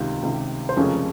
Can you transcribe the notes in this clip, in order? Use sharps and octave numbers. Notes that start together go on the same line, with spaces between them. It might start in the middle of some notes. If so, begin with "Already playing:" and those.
Already playing: C#2 C3 D#3 F4 G4
C#2 C3 D#3
C5
F1 F2 C#3 G#3 C#4 A#4